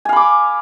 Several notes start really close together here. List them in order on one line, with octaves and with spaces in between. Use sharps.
G#5 F5 B5 D6